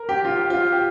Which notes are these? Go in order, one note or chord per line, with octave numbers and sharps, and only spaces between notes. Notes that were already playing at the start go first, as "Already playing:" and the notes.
Already playing: A#4
G4
F4
G4
F4
G4